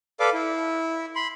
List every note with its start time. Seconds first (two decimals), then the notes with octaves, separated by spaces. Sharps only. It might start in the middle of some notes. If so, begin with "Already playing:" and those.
0.20 A4 B4 D5 F5 D6
0.33 E4
1.15 B5 C6